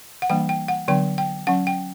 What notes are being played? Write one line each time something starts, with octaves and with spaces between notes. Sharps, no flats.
F#5
E3 G3 A#3 D4 G5
G5
F#5
D3 F#3 B3 D4 G5
G5
F#3 C#4 F#5
G5